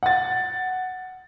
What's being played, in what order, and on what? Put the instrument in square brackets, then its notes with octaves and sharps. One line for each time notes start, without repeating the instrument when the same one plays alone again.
[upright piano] F#5 A6